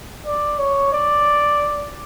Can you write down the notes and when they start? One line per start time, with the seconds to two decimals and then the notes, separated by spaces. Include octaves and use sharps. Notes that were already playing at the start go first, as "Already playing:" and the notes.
0.27 D5
0.59 C#5
0.93 D5